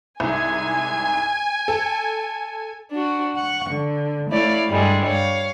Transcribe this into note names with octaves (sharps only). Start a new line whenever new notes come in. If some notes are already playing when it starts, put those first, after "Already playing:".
C2 G#2 G#5
A4
D4 F#4
F#5 C#6
D3
A3 E4 C#5 D5 F5
G2 D3 G3 G#3
C#5 F5